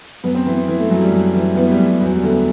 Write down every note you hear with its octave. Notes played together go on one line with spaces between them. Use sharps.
F#2 B3
C4
E3 B3
B3
E3
A3
F#2 F#3
G3
F#2
E3
E3 B3
G3
F#2
G3
E2 F#3
G3
D3 A3
B3